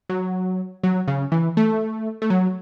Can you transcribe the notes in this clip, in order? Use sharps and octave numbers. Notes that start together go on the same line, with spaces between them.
F#3
F#3
C#3
E3
A3
A3
F#3